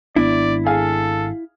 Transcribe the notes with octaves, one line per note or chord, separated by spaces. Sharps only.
G#1 B3 D4 E4 D5
G#4 A4 F5 G#5